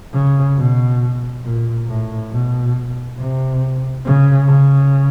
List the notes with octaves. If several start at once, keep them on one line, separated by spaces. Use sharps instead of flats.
C#3
B2
A#2
A2
B2
C3
C#3
C#3